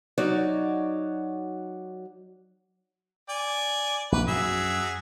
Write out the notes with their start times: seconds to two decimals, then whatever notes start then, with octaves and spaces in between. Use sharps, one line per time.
0.18 F#3 D#4 F#4 C#5 D5
3.29 D5 G#5
4.12 A#1 B4
4.28 F#2 F#3 G#4 E5